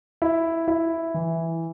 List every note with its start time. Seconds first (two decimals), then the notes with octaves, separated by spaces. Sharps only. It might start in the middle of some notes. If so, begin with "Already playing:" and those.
0.22 E4
0.68 E4
1.14 E3